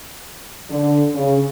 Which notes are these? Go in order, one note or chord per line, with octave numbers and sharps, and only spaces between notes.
D3
C#3